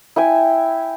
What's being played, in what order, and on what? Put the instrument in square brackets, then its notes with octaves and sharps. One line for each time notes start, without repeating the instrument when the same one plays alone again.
[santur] E4 G5 G#5